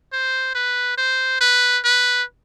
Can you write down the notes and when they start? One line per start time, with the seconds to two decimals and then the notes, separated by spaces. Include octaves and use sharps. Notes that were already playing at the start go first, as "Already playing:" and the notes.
0.13 C5
0.55 B4
0.98 C5
1.41 B4
1.84 B4